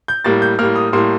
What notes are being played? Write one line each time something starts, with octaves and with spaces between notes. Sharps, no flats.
G6
A2 G3 A#3 A6
G6
A2 G3 A#3 F6
D#6
A2 G3 A#3 C6